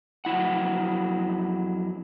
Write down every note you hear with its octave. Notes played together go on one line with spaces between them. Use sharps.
F2 F#3 E4 F#5